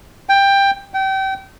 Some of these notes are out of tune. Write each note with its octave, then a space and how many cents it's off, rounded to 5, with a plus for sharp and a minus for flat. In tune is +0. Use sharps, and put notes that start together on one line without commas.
G5 +15
G5 -30